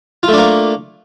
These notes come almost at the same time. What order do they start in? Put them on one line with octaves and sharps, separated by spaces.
F4 A3 D4 A#3